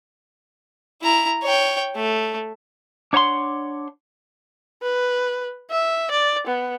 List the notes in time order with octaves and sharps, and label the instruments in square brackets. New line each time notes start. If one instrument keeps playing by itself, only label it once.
[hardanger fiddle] E4 A#5
C#5 G5
A3
[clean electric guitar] D4 C#5 F#5 A#5 C6
[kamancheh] B4
E5
D5
B3